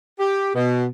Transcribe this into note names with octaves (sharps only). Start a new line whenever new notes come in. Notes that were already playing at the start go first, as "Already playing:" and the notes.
G4
B2